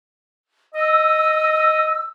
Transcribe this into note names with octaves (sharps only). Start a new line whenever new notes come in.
D#5 E6